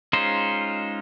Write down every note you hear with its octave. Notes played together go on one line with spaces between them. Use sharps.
G#3 C#4 D#4 F4 C5